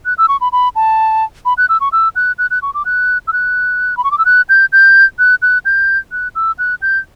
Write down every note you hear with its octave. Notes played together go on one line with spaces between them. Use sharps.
F#6
E6
C#6
B5
B5
A5
B5
F#6
E6
C#6
E6
F#6
F#6
F#6
C#6
D6
F#6
E6
F#6
B5
C#6
D6
E6
F#6
G6
G6
F#6
F#6
G6
F#6
E6
F#6
G6